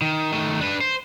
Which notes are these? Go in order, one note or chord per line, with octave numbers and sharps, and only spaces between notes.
D#3
D#3 A3
D4 B4
C5